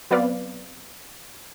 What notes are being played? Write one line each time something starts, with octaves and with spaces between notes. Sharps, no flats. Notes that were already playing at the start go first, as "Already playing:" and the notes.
F#3 B3 C4 B4 D5 F5